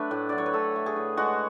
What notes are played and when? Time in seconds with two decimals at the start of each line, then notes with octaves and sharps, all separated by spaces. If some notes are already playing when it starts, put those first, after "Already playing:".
Already playing: F#3 A3 D4 B4
0.11 A2
0.29 F#3 D5
0.38 C#5
0.46 B4
0.53 A2 A4
0.76 A3
0.86 G#4
0.96 A2
1.17 G#3 F#4